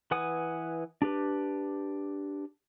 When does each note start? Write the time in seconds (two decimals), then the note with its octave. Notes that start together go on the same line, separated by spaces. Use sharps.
0.11 E3 B4 F#5 G#5 D#6
1.02 D4 G4 B4